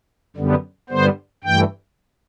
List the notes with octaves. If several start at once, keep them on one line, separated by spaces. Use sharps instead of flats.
F#2 D3 G3 B3
G2 D3 G3 B3 C5
G2 E3 A3 G5